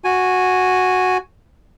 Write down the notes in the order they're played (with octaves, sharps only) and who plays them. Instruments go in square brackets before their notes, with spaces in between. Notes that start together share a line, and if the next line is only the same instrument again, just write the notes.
[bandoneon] F#4 G#5